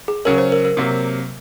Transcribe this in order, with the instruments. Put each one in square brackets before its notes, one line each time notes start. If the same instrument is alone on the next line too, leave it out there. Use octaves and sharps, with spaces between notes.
[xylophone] G#4
[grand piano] C#3 F#3 C#4 [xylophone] A#4
[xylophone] C5
A#4
A#4
[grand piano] C3 F#3 A#3